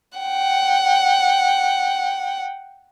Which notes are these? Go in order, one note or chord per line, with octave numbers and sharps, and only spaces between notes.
F#5 G5